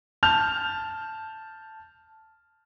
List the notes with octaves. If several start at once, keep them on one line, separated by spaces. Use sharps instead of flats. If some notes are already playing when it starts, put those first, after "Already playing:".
A5 F6 G6 F7